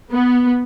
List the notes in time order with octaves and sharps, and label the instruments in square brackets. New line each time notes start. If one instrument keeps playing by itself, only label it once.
[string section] B3